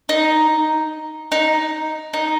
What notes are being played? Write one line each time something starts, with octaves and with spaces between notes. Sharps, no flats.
D#4
D#4
D#4